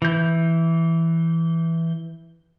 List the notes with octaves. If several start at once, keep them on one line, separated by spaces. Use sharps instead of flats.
E3 G6